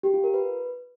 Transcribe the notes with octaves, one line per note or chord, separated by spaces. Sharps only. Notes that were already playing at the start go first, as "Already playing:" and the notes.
G4
F4
A#4
B4